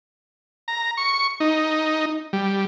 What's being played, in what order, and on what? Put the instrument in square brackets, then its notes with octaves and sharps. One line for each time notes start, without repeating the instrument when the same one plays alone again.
[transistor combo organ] A#5
C#6
D#4
G3